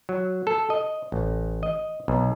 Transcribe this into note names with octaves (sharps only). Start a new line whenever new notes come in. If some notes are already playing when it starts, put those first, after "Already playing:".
F#3
A4
D#5
A1
D#5
B1